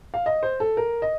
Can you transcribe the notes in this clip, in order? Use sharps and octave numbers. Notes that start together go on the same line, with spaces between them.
F5
D#5
C5
A4
A#4
D#5